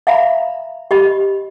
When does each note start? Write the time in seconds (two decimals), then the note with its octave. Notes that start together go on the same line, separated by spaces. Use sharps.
0.07 E5 F5 A#5 B5
0.91 G4 D#5 B5